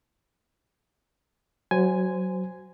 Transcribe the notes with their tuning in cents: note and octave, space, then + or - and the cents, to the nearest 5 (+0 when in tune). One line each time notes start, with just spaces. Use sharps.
F#3 +10 C5 -20 G#5 +0